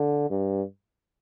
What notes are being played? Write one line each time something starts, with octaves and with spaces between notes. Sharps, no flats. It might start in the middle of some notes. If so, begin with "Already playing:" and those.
Already playing: D3
G2